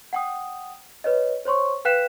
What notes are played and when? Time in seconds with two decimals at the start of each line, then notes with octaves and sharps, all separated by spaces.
0.13 F#5 G5 D#6
1.04 B4 C#5 D#5
1.45 C5 C#5 C6 C#6
1.85 B4 F5 G5 F#6 B6 E7